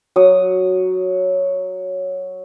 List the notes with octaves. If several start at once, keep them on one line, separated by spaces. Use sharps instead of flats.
F#3 D#6